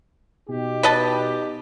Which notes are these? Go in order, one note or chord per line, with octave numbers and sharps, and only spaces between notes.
B2 D#4 G4
B4 D#5 A5